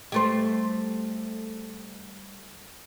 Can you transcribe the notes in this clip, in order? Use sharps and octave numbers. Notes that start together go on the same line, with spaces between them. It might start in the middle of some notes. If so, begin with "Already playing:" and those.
G3 A3 C5